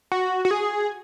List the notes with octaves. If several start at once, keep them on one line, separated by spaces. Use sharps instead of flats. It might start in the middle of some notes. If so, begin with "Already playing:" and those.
F#4
F#4
G#4